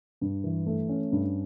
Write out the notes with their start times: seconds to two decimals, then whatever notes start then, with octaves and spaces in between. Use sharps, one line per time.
0.21 G2
0.44 E3
0.67 A3
0.89 C#4
1.12 G2